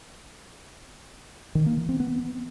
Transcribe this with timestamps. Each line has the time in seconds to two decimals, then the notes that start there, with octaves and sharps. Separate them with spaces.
1.55 D#3
1.66 A#3
1.77 E3
1.89 C4
2.00 B3